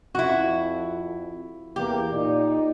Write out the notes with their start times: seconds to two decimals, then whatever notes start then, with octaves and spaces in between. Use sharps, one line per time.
0.15 F2 E4 F#4
1.76 E2 A#3 G4
2.11 A#2 D#4 D5